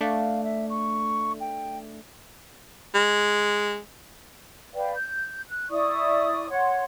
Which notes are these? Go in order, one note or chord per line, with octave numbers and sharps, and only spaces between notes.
A3 D4 F5
E5
C#6
G5
G#3
B4 D5 F5 G5
G6
F#6
E4 D5 C#6 D#6
C#5 F#5 C6